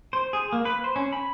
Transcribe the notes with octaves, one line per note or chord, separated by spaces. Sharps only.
C5
G#4
A#3
B4
C5
C#4
B5